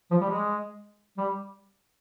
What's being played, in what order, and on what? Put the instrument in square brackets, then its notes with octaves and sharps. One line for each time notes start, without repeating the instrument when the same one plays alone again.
[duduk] F3
G3
G#3
G3